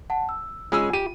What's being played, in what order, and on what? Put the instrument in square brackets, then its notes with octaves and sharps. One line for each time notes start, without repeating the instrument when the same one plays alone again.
[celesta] F#5 A5
E6
[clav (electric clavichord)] G#3 C#4 G#4 [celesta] F4 [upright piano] G#5 E6
[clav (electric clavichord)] G4 [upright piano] D#7